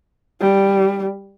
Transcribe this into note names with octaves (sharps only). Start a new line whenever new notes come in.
G3